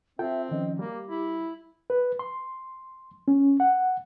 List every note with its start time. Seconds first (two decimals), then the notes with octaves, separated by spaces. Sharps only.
0.19 C4 F4 A4 E5 G5
0.51 D#3 F3 C#4 D#5
0.79 G3 A#3 G4
1.10 E4
1.90 B4
2.19 C6
3.28 C#4
3.60 F#5